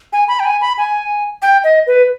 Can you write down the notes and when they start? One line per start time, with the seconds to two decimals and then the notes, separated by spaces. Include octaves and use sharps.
0.13 G#5
0.28 B5
0.40 G5
0.45 G#5
0.61 B5
0.78 G#5
1.42 G5
1.64 D#5
1.87 B4